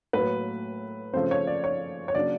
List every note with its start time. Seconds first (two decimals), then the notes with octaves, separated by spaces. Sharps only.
0.13 A2 F#3 A#3 B4
1.13 C#3 F3 A3 C4 C5
1.31 C#5
1.47 D5
1.64 C#5
2.08 C#5
2.15 C#3 F#3 A#3 D4 D5